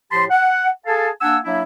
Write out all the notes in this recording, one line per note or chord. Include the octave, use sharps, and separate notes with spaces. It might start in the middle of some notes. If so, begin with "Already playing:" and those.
A2 F3 G4 A5 B5 C6
F#5
G#4 A4 F5 G#5 A5
A#3 D4 F#5 G#5 E6
F#3 A#3 D4 E4